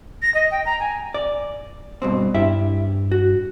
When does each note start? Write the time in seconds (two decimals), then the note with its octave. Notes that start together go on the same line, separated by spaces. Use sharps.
0.22 A#6
0.34 D#5
0.51 G5
0.65 A#5
0.80 G#5
1.14 D5
2.02 G2 B2 C4
2.34 G2 E4 G4 E5
3.12 F#4